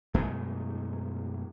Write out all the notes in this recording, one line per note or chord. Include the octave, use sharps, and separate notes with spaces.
F#2 B2 G#3 A3